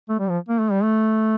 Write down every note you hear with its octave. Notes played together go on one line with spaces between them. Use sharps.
A3
G3
F3
A#3
A3
G3
A3